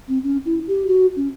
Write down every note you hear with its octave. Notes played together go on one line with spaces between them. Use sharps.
C4
C#4
E4
G4
F#4
C#4